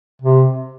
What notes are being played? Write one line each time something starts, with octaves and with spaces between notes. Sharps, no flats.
C3